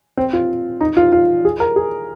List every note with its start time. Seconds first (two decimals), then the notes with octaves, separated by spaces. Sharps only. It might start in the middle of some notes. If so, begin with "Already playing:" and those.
0.17 C4
0.33 F4
0.81 D#4
0.97 F4
1.12 F4
1.45 G#4
1.60 A#4
1.76 G#4